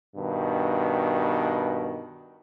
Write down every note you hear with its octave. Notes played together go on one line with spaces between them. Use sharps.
G2 B2 D#3